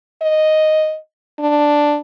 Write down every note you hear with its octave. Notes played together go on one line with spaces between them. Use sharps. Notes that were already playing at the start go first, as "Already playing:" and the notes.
D#5
D4